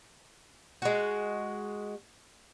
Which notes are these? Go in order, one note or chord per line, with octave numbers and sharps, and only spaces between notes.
G#3 F#4